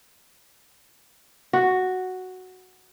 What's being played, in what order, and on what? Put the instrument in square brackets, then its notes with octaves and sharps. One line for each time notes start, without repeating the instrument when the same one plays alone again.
[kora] F#4